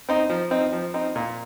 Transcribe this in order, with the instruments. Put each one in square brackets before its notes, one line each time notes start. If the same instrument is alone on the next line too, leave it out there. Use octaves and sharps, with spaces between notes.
[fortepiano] C4 D#4
F3
C4 D#4
F3
C4 D#4
A#2